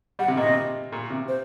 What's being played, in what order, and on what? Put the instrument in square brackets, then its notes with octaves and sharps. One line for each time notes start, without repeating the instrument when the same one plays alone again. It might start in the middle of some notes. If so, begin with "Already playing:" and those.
[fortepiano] G3 [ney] F#5
[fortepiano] C3
[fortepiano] A#2 [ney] D#5
[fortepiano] C3
A#2
C3
[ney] C5